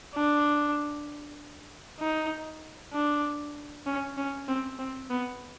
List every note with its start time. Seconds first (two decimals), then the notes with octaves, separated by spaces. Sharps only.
0.15 D4
2.00 D#4
2.93 D4
3.86 C#4
4.17 C#4
4.48 C4
4.79 C4
5.10 B3